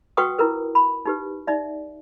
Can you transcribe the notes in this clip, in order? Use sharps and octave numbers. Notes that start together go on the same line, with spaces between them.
F#4 B4 F#5 G5 C#6 D#6
E4 F4 A#4 B4
B5
D#4 G4 B4
D#4 D5 E5